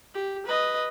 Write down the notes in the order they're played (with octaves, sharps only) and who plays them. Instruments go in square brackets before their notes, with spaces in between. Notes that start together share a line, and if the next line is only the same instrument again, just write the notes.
[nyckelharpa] G4
B4 D#5